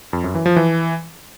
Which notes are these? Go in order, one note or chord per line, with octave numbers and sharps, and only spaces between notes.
F2
F#2
E3
F3
E3